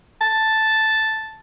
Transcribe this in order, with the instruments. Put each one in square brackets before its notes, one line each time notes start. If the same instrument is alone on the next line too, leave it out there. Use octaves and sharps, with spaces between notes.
[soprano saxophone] A5